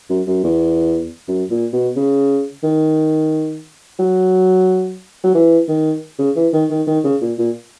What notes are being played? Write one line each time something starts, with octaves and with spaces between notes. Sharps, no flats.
F#2
F#2
E2
F#2
A#2
B2
C#3
D#3
F#3
F#3
E3
D#3
C#3
E3
D#3
D#3
D#3
C#3
A#2
A#2